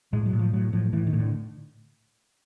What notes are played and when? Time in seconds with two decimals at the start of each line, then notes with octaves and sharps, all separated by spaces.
0.13 A2 G#3
0.26 F#3
0.33 A2
0.39 F3
0.53 A2 F#3
0.73 A2 F3
0.93 A2 E3
1.07 D#3
1.13 A2
1.19 D3